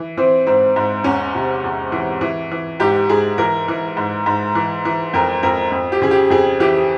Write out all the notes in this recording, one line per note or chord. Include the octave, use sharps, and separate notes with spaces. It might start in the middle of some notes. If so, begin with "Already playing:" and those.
Already playing: E3
E3 C4
G#2 C4
G#2
E2 C#4
C3
E2
E3
E3
E3
G#2 G4
G#2 G#4
E3 A#4
E3
G#2
G#2
E3
E3
F2 A#4
F2 A#4
F2
G4
C#3 G#4
G4
F2 G#4
E3 G4